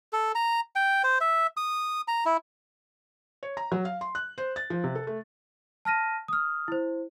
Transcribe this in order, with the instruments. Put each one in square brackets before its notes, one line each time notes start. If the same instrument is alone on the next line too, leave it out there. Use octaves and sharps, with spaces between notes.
[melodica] A4
A#5
G5
C5
E5
D#6
A#5
E4
[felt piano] C#5
A#5
F#3
F5
C6
F#6
C5
A6
F3
C3
A4
A3
[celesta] A5 F6 A#6 D#7
D#6 F6
E4 C5